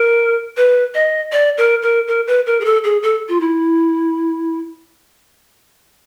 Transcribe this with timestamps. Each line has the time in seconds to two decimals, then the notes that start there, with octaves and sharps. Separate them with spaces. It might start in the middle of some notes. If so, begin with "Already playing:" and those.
Already playing: A#4
0.57 B4
0.94 D#5
1.32 D5
1.58 A#4
1.82 A#4
2.08 A#4
2.27 B4
2.46 A#4
2.61 G#4
2.65 A4
2.84 G#4
3.03 A4
3.29 F4
3.40 E4